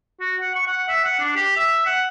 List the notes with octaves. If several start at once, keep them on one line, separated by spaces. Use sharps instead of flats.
F#4
F#5
C#6
F#5
E5
F#5
D4
G4
E5
F#5